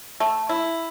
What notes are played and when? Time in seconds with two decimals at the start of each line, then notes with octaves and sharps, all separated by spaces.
0.20 A3
0.49 E4